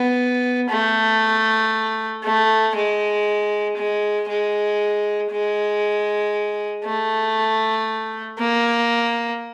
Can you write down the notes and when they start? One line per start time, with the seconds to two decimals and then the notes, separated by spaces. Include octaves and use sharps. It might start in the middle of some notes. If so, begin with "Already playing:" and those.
Already playing: B3
0.70 A3
2.24 A3
2.75 G#3
3.77 G#3
4.29 G#3
5.31 G#3
6.85 A3
8.38 A#3